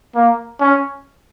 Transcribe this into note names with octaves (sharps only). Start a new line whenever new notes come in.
A#3
C#4